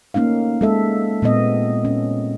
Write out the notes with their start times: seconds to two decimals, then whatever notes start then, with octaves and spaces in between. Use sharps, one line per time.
0.14 A3 A#3 C#4 D#4 F5
0.61 G#3 A4 E5
1.22 A#2 G#3 B3 C4 D#5
1.85 C#4